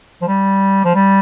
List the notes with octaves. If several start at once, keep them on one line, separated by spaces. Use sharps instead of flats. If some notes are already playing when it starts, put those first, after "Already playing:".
F3
G3
F3
G3